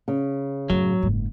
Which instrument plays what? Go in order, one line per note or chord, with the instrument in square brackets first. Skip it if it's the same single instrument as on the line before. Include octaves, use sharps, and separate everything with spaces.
[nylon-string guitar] C#3
[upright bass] F#2 A2 [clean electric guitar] F#3
[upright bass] F#1 G#2